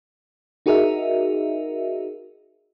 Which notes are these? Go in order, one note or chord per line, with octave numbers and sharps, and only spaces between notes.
D#4 F#4 G#4 A#4 D#5 E5